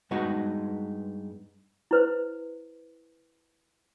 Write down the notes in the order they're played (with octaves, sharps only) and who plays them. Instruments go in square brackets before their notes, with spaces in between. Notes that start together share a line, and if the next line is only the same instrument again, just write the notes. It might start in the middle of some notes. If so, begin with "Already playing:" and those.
[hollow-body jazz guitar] G2 G#3 B3 D#4 F#4
[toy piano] E4 B4 C5